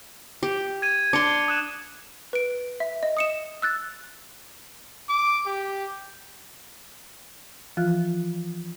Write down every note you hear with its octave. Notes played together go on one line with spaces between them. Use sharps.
G4
G#6 D#7
D4 C6 D6 C#7
D#6 F#6 E7
B4 D7
E5
D#5
D#6 C#7 E7
E6 F#6 A6
D6
G4
E3 F3 F4 F#6